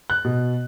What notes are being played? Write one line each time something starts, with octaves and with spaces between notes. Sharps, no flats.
F#6
B2